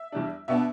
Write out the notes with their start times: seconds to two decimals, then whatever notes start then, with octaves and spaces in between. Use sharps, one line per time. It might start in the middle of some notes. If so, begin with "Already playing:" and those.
Already playing: E5
0.12 E2 E3 G3 D4
0.48 B2 B3 D4 E5